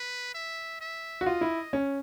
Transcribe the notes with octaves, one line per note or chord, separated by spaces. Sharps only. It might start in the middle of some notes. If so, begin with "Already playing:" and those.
Already playing: B4
E5
E5
F#4
F4 D#5
E4
C#4